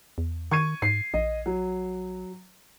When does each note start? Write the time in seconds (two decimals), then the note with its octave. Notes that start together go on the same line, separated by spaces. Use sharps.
0.18 E2
0.52 D#3 C#6 G#6 D#7
0.82 G#2 C7
1.14 A#1 D#5
1.46 F#3